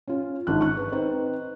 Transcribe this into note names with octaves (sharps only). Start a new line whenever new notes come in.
C#4 F4
G#1 D4 F#6
C#6 F#6
B4
C4 D#4 B4 C5